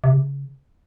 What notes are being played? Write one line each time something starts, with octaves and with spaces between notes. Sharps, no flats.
C3
C#3